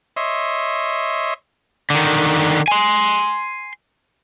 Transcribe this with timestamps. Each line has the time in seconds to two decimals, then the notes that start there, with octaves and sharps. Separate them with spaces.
0.16 C#5 D#5 E5 C6
1.90 D3 D#3
2.68 G#5 C6